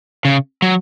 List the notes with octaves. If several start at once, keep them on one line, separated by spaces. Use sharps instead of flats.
C#3
F#3